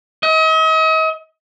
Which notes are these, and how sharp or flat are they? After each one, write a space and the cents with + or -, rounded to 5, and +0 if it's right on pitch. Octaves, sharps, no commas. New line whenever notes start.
D#5 +40